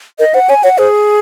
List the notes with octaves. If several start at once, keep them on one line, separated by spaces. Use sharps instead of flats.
A#4 D#5
C5 F#5
C#5 G#5
C#5 F#5
G#4 C5